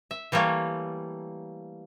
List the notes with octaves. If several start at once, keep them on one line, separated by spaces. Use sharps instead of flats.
E5
E3 G3 A3 A#3 C#5